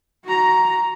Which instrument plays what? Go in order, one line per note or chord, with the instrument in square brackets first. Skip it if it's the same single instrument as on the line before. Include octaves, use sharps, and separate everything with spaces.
[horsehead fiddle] F#4 A#5